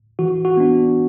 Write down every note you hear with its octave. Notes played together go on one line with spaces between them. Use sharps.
E3 F#4
F#4
B3 D4